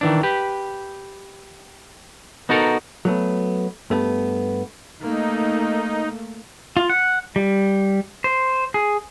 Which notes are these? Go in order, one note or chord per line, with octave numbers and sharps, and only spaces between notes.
D#3 E3 D4
G4 B4
B3 D#4 F#4 A4 A#4
F#3 A3 B3
G2 A3 B3
A3 A#3 D#4
F4
F#5
G3
C5
G#4